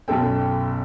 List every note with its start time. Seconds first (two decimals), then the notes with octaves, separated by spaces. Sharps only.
0.08 B1 F#2 A4 G5